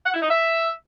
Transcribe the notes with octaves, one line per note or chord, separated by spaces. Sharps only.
F#5
E4
D#4
E5